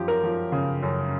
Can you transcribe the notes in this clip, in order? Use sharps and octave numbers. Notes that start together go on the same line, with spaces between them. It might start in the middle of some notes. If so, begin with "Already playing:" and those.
Already playing: F#2 F3 G4
A#4
F3
C#3
F#2